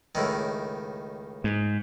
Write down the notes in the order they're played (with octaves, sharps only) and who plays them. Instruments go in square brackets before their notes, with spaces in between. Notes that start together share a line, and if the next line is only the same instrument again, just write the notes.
[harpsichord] C#2 A2 D#3
[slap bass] G#2